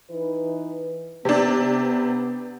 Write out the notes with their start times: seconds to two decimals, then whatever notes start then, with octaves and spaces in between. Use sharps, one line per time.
0.10 E3 D#4 B4
1.25 C3 B3 D4